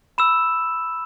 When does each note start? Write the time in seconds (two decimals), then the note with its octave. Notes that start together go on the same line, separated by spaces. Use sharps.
0.18 B5 E6 E7